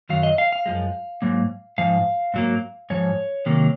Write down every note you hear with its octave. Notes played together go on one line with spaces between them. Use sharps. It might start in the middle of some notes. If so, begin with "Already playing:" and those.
F#2 D#3 F#3 F5
D#5
F5
F5
F#2 F3 G#3
G#2 F#3 A#3
G#2 F3 F5
G#2 F#3 A#3
G#2 F3 C#5
C3 D#3 F#3 A#3